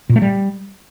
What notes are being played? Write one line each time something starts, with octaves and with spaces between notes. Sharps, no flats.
A#2
A3
G3